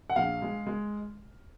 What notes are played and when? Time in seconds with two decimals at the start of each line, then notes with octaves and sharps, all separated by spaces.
0.10 F#5
0.16 A#1 F5
0.42 G#3
0.66 G#3